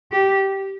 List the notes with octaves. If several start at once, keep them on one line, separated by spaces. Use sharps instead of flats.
G4